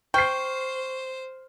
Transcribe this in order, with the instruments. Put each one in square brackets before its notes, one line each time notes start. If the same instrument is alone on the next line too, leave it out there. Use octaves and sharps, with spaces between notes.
[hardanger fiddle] C5 [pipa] G5 [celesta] C#6 [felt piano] F6 C7